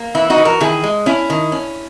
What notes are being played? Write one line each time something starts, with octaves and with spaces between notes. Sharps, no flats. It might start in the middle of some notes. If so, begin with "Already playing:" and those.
Already playing: A#3
E3 E4
D#4 F#4
E3
F#4 A#4
D#3 E4 G#4
G#3
C#4 E4
D#3
C#4